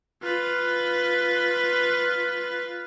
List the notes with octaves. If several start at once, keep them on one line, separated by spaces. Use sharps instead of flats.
F4 B4